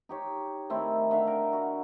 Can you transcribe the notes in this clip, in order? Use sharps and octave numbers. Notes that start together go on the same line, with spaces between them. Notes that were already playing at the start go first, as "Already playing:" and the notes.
D#4 G4 C#5
D#3 A3 C4 E4
D3 E5 F5
A#4
F#4